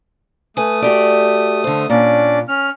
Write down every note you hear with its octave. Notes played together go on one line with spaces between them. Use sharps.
A3 B4 G#5 D#6
F#4 G4 D5
D3 C5
A#2 C#4 D4 D5
C#4 F6